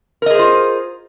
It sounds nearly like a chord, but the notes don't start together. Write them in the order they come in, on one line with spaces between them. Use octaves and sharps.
A#4 D#5 G#4 C5 F4